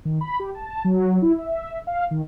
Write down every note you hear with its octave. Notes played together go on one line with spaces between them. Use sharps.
D#3
B5
G4
A5
F#3
E4
E5
F5
D#3